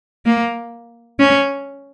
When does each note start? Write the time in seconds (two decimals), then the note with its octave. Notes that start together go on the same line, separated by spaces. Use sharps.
0.25 A#3
1.19 C#4